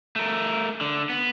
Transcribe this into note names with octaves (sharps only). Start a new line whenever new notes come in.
A3 A#4
D3
B3